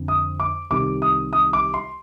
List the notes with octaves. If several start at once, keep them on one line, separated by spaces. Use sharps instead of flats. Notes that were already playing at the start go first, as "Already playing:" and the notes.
Already playing: F2 D3
D#6
D6
C2 C3 D#3 D6
D#6
D#6
D6
C6